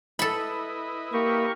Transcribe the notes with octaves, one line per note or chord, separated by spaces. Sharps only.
E4 A4 B4 D#5 B5
A#3 G4 A#4 C#6